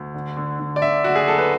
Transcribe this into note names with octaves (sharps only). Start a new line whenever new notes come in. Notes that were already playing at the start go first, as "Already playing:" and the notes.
Already playing: D2
D3
D3
D3
D5
D3 E5
F#1 F#4
G#4
F#2 A4
B4